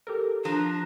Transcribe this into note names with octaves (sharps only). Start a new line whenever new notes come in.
G4 A4 A#4
F3 D4 A#5